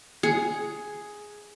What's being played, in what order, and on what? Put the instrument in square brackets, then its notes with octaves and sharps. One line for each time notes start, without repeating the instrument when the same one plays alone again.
[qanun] G#4